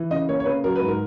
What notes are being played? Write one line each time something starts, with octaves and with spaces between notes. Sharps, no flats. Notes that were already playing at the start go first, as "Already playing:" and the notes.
Already playing: E3
C#3 D#5
A#3 C#5
C#5
C#3 B4
F#3 A#4
B4
G#2
A#4